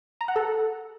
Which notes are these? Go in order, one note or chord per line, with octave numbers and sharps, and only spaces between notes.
A#5
F#5
A4